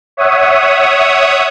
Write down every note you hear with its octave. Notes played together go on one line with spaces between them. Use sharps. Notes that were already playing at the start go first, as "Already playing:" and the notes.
C#5 E5 F#5 D#6